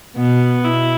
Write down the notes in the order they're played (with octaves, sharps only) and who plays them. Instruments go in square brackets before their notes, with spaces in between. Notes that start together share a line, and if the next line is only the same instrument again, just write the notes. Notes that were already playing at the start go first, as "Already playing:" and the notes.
[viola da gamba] B2 [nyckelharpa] B3
[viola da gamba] B2 [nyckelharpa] E4